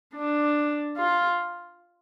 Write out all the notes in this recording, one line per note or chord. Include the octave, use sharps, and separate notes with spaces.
D4
F4